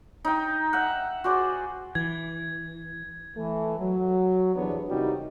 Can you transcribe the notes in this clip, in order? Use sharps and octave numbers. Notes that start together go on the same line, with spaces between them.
D#4 G5
E5 F#5
F#4 G#4 C5 D5
E3 G#6
E3 A3
F#3
E2 C3 B3 D4 C#5
C3 D#3 G3 D#4 E4 F#4